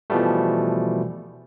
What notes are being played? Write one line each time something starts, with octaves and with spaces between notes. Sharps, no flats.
B2 E3 F3 G3 A3